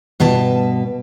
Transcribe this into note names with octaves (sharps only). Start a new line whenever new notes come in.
G2 B2 B4 A5